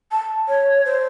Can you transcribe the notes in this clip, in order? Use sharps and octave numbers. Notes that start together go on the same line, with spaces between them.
A5
C#5
C5